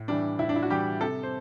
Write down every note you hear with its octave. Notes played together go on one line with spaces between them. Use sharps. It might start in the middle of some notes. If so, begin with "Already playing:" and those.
Already playing: A2
E3 G3 D4
A2 E4
D4
E4
F#4
E3 G3 G4
C3 A4
C5